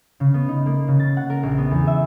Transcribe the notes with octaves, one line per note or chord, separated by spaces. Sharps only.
C#3
B3
D#4
A#3
C#3
A6
F#5
A#4
A#1
B3
E2
E5